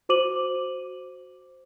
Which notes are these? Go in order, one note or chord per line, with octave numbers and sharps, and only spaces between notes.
F#4 C5 D6 D#7 F#7